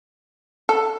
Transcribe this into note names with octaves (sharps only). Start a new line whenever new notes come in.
A4